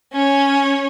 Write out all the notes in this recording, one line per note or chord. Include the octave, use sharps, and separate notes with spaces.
C#4 C#5